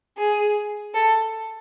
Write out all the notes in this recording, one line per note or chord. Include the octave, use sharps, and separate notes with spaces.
G#4
A4